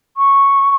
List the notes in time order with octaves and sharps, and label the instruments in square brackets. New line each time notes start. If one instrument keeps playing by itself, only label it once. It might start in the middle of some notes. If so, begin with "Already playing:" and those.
[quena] C#6